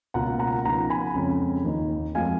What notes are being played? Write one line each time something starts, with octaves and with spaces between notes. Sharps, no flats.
C#2 B2 A#3 F4 F#5 A#5
F#5 A#5
C#3 F3 B3 D#4 F#5 A#5
G#5 B5
F2 C#3 G#3 C#4
D#2 D#3 A#3 D#4
F2 F3 G#3 F5 G#5